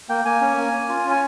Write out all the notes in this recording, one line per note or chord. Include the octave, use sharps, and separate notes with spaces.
A#3 G5
A#3 G#5
C#4
A#3
C#4
F4
C#4
G#5